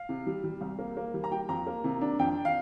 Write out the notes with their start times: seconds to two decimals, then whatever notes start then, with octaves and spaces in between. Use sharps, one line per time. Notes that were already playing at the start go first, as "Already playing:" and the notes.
Already playing: F5
0.09 C3
0.27 G3
0.44 G3
0.61 C2
0.79 A#3
0.97 A#3
1.14 G3
1.24 A#5
1.31 G3 G5
1.48 F2 A#5
1.67 A#3
1.84 C3
2.01 D4
2.19 F2 G5
2.45 F5